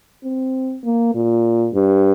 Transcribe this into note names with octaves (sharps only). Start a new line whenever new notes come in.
C4
A#3
A#2
G2